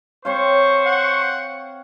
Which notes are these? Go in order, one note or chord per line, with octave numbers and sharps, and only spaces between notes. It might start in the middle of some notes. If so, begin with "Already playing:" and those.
C4 C5 C#5 F5 C#6
F#5